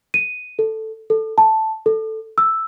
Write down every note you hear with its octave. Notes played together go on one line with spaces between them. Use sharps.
D#7
A4
A4
A5
A4
E6